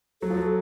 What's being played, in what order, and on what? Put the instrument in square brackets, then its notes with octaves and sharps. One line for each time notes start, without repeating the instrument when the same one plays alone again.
[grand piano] F#3 [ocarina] A4
[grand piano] F3
F#3